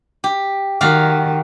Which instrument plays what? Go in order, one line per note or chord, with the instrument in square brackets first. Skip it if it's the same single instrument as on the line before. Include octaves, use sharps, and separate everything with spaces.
[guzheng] G4
[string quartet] D#3 [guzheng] F#4 G4 F5